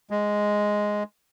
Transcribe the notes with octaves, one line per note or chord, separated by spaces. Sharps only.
G#3